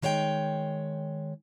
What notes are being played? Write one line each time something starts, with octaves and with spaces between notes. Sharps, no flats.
D#3 G#3 C#5 F#5 G5